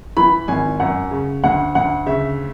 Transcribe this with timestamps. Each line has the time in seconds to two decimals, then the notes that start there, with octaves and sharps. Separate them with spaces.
0.17 E3 B5
0.48 G#1 G#5
0.80 F#2 F#5
1.11 C#3
1.44 D2 F#5
1.75 D2 F#5
2.06 C#3 E5